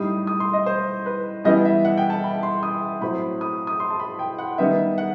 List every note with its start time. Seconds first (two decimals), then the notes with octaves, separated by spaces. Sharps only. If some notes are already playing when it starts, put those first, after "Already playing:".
Already playing: A2 G3 D#4 D#6
0.27 D#6
0.40 C6
0.53 D#5
0.66 C5
1.06 B4
1.44 E3 G3 B3 E4 D#5
1.65 E5
1.85 F#5
1.97 G5
2.10 A5
2.24 B5
2.43 C6
2.63 D#6
3.01 A2 F#3 C4 B5
3.41 D#6
3.67 D#6
3.80 C6
3.90 A5
4.00 B5
4.19 G5
4.38 F#5
4.58 D#3 G3 B3 D#4 E5
4.98 F#5